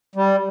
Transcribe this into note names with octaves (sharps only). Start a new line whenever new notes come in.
G3